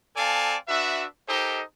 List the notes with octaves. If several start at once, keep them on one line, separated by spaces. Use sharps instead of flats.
C4 A4 D5 F5 G#5 A5
D4 F#4 B4 E5
D#4 G4 A4 A#4 C5 D#5